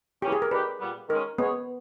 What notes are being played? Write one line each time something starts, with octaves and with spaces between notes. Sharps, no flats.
C#3 E3 A#3 C#4 G4
G#4
A#4
D#3 G3 B3 G4 B4
A#2 G3 B3
D#3 G#3 C#4 A#4
G#3 B3 C#4 G#4 C#5